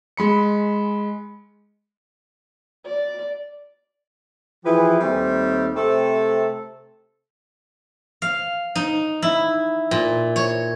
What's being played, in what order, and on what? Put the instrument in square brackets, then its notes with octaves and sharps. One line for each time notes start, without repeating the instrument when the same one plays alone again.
[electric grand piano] G#3 B5 C#7
[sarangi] D5
[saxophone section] E3 F3 E4 G4 G#4 B4
D#2 G3 A3 C4
C3 A3 C4 A4
[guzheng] F5
D#4
E4
A#2
C#5